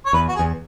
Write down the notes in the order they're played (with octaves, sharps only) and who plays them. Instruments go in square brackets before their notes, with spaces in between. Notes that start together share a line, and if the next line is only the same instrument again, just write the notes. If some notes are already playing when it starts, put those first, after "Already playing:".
[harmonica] C#5
[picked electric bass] E2 [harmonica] B4
[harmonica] F#4
G#4
[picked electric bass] E2